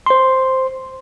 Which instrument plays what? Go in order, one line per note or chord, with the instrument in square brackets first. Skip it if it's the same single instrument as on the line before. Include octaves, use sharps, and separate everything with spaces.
[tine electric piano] C5 C6